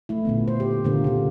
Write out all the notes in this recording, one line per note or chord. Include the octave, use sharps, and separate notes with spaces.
A3 E4
A#2 D3 B3
C5
G4
A#2 D3 A#3
C#3 G4